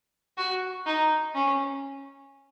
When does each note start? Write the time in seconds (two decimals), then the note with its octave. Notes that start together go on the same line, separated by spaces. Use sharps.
0.37 F#4
0.86 D#4
1.34 C#4